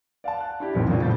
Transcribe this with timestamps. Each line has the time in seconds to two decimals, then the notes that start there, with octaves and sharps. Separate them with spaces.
0.24 D5 F5 F#5 A5
0.40 F#6
0.60 D4 E4 G4
0.75 C2 F2 A2 D#3 B3 C4
0.88 F2 A#2 C#3 C4 D4 F4
1.02 A2 F3 G3 A#3 G6 A6